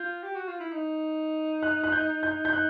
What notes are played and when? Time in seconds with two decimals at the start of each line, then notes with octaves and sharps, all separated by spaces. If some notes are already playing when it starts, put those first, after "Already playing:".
Already playing: F4 G6
0.23 G4
0.36 F#4
0.48 F4
0.60 E4
0.73 D#4
1.63 F#6
1.84 F#6
1.92 G6
2.23 G6
2.45 G6
2.53 D#4 F#6